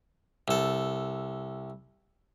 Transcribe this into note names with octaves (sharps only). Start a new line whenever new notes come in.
C2 A4